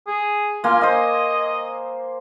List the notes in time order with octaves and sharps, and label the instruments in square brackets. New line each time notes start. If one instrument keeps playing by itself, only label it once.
[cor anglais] G#4
[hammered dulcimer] A#3 G#5 [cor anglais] F4
[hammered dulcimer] C5 G#5 [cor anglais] D#5